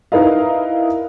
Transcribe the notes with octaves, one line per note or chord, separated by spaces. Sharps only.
D#4 E4 A#4 B4 D#5 F5